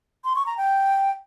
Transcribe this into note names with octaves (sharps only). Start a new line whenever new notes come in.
C6
C#6
A#5
G5